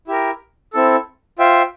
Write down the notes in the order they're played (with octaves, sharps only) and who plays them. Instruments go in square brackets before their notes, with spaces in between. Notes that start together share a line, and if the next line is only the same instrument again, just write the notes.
[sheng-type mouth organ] E4 G4 A#4
C4 E4 A4
F4 C5 E5 G5